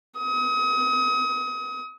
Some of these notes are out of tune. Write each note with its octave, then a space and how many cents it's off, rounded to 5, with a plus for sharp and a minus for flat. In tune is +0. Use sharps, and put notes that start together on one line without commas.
D#6 +35